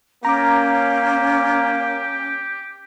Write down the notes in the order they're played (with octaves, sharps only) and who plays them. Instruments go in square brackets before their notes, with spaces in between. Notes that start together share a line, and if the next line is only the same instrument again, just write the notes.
[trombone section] A#3 [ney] C#4 [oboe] G4 [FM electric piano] A#5 D6